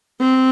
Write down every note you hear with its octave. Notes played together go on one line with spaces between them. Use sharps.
C4